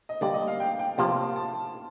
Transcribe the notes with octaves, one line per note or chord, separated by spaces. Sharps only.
D#5
D3 G3 A#3 D5
D#5
F5
G5
G5
C3 F3 A#3 A5
A5